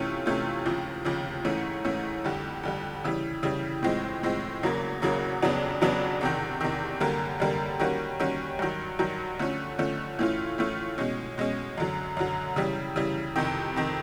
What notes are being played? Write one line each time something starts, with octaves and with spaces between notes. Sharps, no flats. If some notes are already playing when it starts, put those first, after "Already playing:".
Already playing: C3 E3 A3 C#4 F4
C3 E3 A3 C#4 F4
D#2 C#3 F3
D#2 C#3 F3
G#2 E3 A3 C#4
G#2 E3 A3 C#4
F2 D3 G3
F2 D3 G3
C#3 E3 G3
C#3 E3 G3
A2 F3 G#3 C4
A2 F3 G#3 C4
E2 C#3 F#3 A#3
E2 C#3 F#3 A#3
F2 C#3 F#3 B3 D4
F2 C#3 F#3 B3 D4
E2 C3 D#3
E2 C3 D#3
F#2 D3 G3 A#3
F#2 D3 G3 A#3
D#3 G3 A#3 C#4 F#4
D#3 G3 A#3 C#4 F#4
G2 D#3 F#3
G2 D#3 F#3
D3 F3 A3 C#4
D3 F3 A3 C#4
A2 E3 A3 C#4 F4
A2 E3 A3 C#4 F4
B2 G#3 C#4
B2 G#3 C#4
F#2 D3 F#3
F#2 D3 F#3
C#3 E3 G3
C#3 E3 G3
F2 C3 D#3
F2 C3 D#3